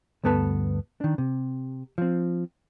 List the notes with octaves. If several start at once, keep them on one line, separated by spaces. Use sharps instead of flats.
D2 G2 B3 A4 B4 A5
D#3 D4
C3
F3 C4